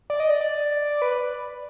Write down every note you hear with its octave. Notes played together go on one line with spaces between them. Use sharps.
D5
D#5
D5
D5
B4